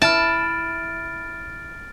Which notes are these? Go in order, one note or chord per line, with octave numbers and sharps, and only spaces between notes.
E4 A5 F6 A6 D7